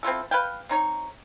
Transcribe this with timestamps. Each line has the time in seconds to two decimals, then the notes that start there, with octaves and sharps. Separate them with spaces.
0.03 C4 E4 F4 A4
0.31 B4 F5 G5
0.69 C4 D#4 C#5 A#5